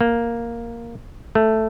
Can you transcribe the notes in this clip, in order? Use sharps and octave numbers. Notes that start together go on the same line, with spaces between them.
A#3
A3